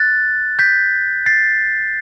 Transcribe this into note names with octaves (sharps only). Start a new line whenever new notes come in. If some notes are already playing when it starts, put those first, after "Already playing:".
Already playing: F#6 A6
G6 B6
A6 C7